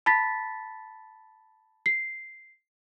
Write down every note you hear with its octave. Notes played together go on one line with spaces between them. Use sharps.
A5 B5 A6 B6
C7